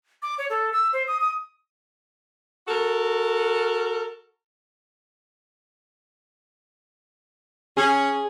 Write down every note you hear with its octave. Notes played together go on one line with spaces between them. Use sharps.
D6
C#5
A4
E6
C5
D#6
D#6
F#4 A4 A#4
C#4 G#4